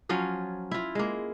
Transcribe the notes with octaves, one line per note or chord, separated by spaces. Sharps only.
F3 F#3 C#4 F4
E4 F4
G#3 A#3